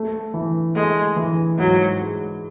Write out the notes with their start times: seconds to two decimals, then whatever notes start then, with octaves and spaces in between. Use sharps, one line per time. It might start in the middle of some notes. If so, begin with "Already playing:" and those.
Already playing: A3
0.34 E3
0.75 G#3 A3
1.16 E3
1.58 G#2 F#3
1.99 G#3